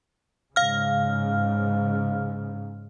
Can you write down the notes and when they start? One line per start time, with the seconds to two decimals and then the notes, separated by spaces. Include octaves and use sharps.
0.56 G#2 C#3 F5 F6